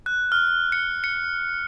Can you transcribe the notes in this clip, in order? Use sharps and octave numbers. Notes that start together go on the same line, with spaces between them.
F#6
F6
C#7
C#7